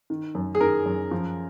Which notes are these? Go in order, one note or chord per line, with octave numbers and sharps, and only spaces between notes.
D#3
F#2
G#4
D#3 A#4
F#2
F3